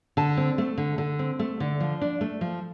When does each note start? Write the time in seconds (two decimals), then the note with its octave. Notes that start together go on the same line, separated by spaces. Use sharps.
0.17 D3 A5
0.37 C4
0.58 A3
0.78 D3
0.98 D3
1.19 C4
1.39 A3
1.60 D3
1.80 F3
2.01 D4
2.21 A3
2.41 F3